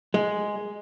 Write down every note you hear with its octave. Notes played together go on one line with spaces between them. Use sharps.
G#3